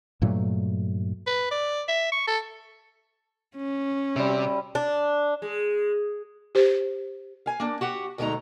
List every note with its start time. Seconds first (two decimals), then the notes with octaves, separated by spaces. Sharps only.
0.22 G2 A#2 F#3 A3
1.27 B4
1.51 D5
1.88 E5
2.12 C#6
2.27 A4
3.56 C#4
4.16 C3 G3 E5
4.75 D4
5.42 G#3
6.55 G4 C5
7.46 F5 G#5
7.60 A#3 D4
7.81 F#4 G4 F#5
8.18 D2 B2 G#3 A3 D#4 A#5